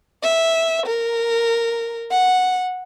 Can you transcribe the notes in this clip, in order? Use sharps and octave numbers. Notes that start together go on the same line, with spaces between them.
E5
A#4
F#5